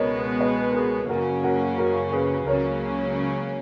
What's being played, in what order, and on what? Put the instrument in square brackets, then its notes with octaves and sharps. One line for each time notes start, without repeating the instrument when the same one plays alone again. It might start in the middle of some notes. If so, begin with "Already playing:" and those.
Already playing: [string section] C#2 B2 G#3 B3 [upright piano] A#4 C#5 D#5
[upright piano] B4 D#5
A#4
G#4 B4
[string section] F#2 C#3 F#3 A#3 C#4 [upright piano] F#4 A#4
[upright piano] F#4 A#4
F#4 A#4
G#4 B4
[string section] C#2 C#3 F#3 A#3 C#4 [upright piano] A#4 C#5